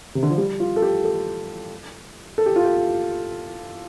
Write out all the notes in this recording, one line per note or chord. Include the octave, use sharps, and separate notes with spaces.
C3
D3
F3
G3
F4
A4
G4
A4
A4
G4
F4
G4